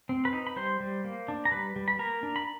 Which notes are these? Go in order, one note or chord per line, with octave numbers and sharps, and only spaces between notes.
C4
B4 B5
D#4
B5
G3 C5 C6
G3
A#3
D4
A#5
G3 B4 B5
G3
B5
A#3 A#4 A#5
D4
B5